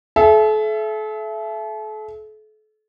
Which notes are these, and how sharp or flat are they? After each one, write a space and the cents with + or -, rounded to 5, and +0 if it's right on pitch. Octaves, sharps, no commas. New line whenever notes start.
A4 -40 E5 +20